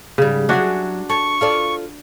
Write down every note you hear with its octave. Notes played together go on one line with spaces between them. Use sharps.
G#2 C#3 G3
F#3 D4 E4 F#4 G#4
A4 C#6
F4 A4 D5